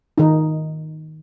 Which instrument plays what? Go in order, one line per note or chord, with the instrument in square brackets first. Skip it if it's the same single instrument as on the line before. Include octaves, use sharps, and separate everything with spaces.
[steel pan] D#3 D#4